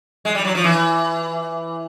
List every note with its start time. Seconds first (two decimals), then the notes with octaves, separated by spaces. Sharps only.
0.25 G#3
0.35 G3
0.45 F#3
0.55 F3
0.64 E3